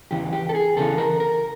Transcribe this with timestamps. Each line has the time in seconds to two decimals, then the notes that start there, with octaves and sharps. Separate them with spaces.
0.11 E2 C#3 E3 G4
0.33 G4
0.49 A4
0.55 G#4
0.76 E2 C#3 E3 A4
0.98 A#4
1.20 A#4